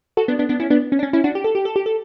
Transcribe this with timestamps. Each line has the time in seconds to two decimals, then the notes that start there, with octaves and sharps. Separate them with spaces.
0.17 F#4 A4
0.28 B3 D4
0.39 B3 D4
0.49 B3 D4
0.60 C#4 E4
0.70 B3 D4
0.92 C#4
0.99 D4
1.03 C#4
1.13 C#4 E4
1.24 D4 F#4
1.35 G4
1.44 A4
1.55 G4
1.65 A4
1.76 G4
1.86 A4